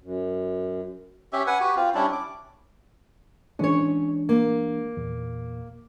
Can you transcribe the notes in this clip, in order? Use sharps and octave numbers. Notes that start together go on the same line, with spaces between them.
F#2
C#4 G4 E5
B4 F#5 G#5
F#4 G4 B4
C4 F4
G3 C#4 D4 E4
D6
E3 G#3 C#4 D4 C#5
A#3
E2 A#2